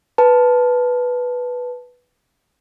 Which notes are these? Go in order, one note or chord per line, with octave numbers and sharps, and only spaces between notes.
B4 A5